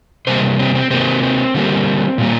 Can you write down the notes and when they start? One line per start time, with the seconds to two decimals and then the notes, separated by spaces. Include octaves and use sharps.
0.27 C3 G3 A#3 C5
0.59 C4
0.75 C4
0.90 C3 A#3 C4
1.23 C4
1.54 D3 G3 A#3
2.18 A#2 G3 A#3